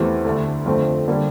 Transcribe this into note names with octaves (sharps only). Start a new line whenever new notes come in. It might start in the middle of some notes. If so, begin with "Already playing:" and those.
Already playing: E2 E3 A3 C4 G4
D2 D3 A3
F2 D3 A3 C4
D3 G3 A#3